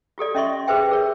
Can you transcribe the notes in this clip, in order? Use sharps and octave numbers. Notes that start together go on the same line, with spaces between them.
F4 G4 A4 D5
C#4 D#5 E5 C6 C#6
G4 G#4 B4 C5 E5 G5
G#4 A#4 C#5